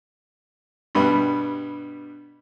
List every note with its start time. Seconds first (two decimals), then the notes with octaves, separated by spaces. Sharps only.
0.95 G2 B2 G3 B3